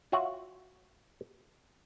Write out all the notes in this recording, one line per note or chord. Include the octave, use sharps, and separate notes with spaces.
F4 F#4 C#5 E5 F#5